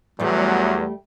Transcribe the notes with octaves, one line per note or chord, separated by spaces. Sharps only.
E2 F#3 G3 A3